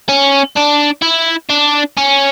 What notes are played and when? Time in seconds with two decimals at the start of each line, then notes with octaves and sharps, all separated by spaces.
0.09 C#4
0.56 D4
1.02 E4
1.50 D4
1.97 C#4